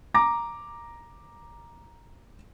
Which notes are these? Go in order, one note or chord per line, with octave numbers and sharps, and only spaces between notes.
A#5 D6 A#6